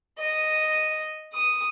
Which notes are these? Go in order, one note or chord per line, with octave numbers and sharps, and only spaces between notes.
D#5
D#6